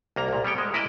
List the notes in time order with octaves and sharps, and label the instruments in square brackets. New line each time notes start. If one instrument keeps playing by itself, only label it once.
[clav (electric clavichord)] C2 A#3 A#5
C2 A#2
G3 B3 C#5 G5
G#3
A#3 E4 A#4 B4 D5 D#5